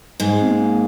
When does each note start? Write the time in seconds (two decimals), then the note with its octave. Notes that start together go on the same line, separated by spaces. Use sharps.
0.20 G#2 G#3
0.41 C4
0.47 A#3